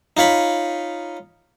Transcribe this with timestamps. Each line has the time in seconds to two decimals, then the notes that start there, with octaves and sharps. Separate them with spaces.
0.17 D#4 F4 C#5 B5